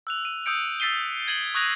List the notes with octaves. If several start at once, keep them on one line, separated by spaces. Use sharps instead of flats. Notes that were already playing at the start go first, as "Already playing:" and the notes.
E6 F#6 F7
D#7
D#6 E6 G6 C#7 D7
E6 A6 B6 C7 D#7 G7
G#6 A6 C7 D#7 F#7
C#6 D#6 F#6 G#6 A#6 F7